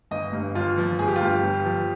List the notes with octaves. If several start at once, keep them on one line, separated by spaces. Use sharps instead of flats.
G1 D#5
G2
G1 F4
F3
G1 G#4
G4
F4
G2 G4
G1
F3